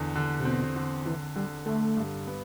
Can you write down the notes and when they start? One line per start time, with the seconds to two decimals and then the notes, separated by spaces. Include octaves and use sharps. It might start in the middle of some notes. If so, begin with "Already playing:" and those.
Already playing: E2 D3
0.15 D3
0.40 C3
0.45 B2 C4
0.76 D3
1.05 D3 E3
1.36 D3 G3
1.66 D3 A3
1.97 G2
2.27 B3